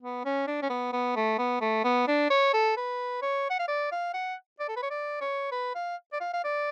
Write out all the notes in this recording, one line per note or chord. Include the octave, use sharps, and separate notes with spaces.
B3
C#4
D4
C#4
B3
B3
A3
B3
A3
B3
D4
C#5
A4
B4
C#5
F#5
F5
D5
F5
F#5
D5
A4
B4
C#5
D5
C#5
B4
F5
D5
F5
F5
D5